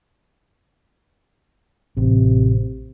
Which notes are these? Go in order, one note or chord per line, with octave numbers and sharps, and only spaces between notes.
A1 C3